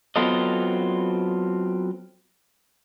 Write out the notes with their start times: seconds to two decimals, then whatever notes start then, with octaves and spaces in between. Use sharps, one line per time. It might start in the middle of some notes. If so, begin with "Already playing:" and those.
0.16 F#3 B3 C4 F4 A4 D#5